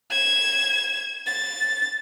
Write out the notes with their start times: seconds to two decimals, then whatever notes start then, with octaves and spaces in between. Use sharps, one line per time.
0.11 G#6 E7
1.27 A6